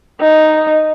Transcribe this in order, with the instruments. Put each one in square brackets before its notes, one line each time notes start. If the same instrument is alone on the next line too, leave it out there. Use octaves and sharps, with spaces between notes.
[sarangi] D#4